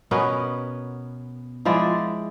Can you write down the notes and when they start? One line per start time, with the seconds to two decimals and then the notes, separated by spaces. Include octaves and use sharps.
0.11 B2 B3 C#4 A#4
1.65 F3 G#3 E4 D5